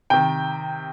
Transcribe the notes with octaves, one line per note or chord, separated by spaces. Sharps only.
C3 D#3 G5